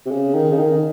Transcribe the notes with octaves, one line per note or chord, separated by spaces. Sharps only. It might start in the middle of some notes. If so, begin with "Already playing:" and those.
C3
C#3
D#3
C#3
D#3